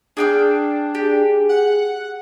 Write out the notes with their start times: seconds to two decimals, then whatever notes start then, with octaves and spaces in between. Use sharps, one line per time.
0.17 D4 G#4 G5 F6
0.95 G4 G#4
1.49 F#5